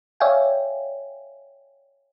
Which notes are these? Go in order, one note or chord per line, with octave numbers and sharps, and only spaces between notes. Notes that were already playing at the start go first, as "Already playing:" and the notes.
C#5 D5 E5 F5 G5 G#5